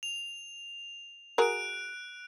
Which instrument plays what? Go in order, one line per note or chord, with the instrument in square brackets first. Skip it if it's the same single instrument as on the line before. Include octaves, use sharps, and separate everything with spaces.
[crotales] F7
[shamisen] F#4 G#4 A#4 [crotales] F#6 D7